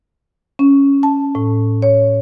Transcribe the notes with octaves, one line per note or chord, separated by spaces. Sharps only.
C#4
A5
A2
C#5